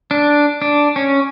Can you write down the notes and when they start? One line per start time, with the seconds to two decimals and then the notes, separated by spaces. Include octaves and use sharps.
0.11 D4
0.62 D4
0.96 C#4